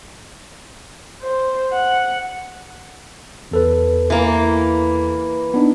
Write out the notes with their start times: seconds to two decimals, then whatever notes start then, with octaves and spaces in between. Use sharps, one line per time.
1.23 C5
1.73 F#5
3.51 E2 A4 B4
4.10 E3 A#3
5.54 B3 D4 D#4